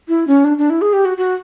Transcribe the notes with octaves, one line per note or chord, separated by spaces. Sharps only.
E4
C#4
D4
D4
E4
G#4
G4
F#4
F#4